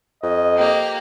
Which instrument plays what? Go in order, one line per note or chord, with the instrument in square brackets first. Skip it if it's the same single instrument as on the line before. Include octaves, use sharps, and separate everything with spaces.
[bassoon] F2 [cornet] D#5
[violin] A#3 G4